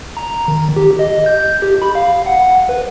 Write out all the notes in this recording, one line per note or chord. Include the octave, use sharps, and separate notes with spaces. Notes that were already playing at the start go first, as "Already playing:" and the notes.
A#5
D#3
G4
D#5
G6
G4
B5
F5
F#5
B4